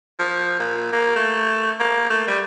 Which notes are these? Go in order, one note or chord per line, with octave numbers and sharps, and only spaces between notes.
F3
A#2
A#3
A3
A#3
A3
G3